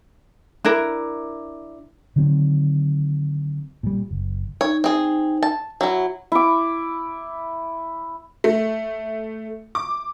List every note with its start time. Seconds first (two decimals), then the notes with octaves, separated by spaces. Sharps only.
0.65 D4 E4 A#4
2.16 D3 D#3 F#3 C4
3.83 A#2 G3
4.11 F#1
4.61 D#4 C#5
4.84 C4 G#4
5.43 A5
5.81 F#3 E4 F#4
6.32 E4 D6
8.44 A3
9.75 D6